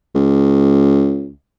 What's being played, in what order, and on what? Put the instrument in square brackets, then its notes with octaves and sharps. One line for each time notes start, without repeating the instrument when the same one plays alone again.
[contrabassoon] C#2